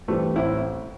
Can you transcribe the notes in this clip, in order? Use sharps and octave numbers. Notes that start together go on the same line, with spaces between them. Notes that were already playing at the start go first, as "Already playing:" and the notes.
G2 E3 G3 A3 C4
A1 C4 E4